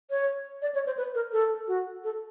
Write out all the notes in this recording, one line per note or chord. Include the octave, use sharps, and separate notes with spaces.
C#5
D5
C#5
C5
B4
A#4
A4
F#4
A4